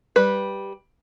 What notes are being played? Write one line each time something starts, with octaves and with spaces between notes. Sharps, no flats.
G3 B4